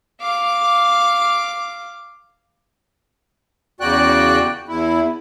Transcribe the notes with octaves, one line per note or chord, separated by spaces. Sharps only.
F5 D6
E2 C#3 F#4 D5 G5 F#6
E2 E4